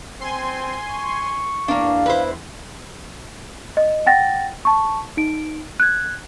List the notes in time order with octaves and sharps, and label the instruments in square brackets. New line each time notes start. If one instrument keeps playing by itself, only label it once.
[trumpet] C4 [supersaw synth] G#5 C6
[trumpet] C#6
[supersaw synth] E2 [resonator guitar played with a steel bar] A#3 D4 [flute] F5
[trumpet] E4 [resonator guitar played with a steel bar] B4 C5
[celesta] D#5
F#5 G5 A6 A#6
A5 C#6
D#4 D7
F#6 G#6